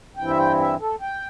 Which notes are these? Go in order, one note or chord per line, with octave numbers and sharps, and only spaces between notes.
G2 E3 C4 E4 G5
E5
G5
E5
A4
G5